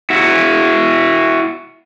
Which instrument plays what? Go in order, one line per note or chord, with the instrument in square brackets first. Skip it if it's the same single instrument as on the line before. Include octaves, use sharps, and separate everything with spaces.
[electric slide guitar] E4 F#4